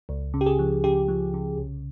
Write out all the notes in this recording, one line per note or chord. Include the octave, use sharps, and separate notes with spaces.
C#2
C#3
G4
G#4
F3
C#3 G4
F3
C#3
C2